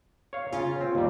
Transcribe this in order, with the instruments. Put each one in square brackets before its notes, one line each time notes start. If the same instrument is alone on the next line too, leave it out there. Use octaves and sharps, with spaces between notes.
[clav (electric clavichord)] C#5 F5
[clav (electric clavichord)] C#3 C#4 [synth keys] F4
[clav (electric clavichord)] C4
D#2 G3